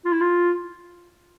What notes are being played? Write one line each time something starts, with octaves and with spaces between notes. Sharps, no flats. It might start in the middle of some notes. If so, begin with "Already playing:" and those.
F4
E4
F4